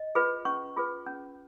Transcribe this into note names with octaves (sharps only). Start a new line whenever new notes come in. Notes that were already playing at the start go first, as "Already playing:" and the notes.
Already playing: D#5
F4 G#4 B4
C#4 C#6
F4 G#4 B4
C#4